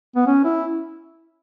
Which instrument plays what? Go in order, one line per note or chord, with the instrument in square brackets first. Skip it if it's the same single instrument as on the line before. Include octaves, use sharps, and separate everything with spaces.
[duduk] B3
C#4
E4